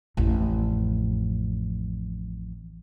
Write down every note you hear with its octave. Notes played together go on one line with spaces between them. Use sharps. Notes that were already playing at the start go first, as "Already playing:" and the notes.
A1 F2